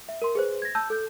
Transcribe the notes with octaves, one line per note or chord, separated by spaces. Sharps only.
E5
A#4 C6
G#4 B4 C5
G#6 A#6
A5 E6 G6
A4 G6